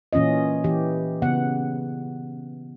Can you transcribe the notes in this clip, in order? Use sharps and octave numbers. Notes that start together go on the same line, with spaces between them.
A#2 E3 C#4 F4 D#5
E3 G4
C#3 B3 F#5